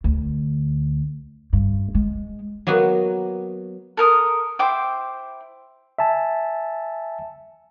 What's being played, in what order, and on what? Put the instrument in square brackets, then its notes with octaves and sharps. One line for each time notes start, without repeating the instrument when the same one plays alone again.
[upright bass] D2
G2
G#3
[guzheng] F#3 A#3 B3 F#4
[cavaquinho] A4 A#4 D#6
E4 C5 G5 D6
[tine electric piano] E5 G#5 A5